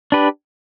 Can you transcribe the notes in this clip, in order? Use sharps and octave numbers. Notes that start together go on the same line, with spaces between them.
D4 G4 B4